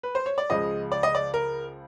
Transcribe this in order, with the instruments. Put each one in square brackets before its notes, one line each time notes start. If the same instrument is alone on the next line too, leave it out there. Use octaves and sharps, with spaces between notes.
[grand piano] B4
C5
C#5
D5
C#2 C#3 F3 G#3 D#5
D5
D#5
D5
A#4